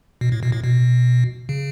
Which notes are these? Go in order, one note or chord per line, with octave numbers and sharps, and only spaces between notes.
B2
A2
B2
A2
B2
C#3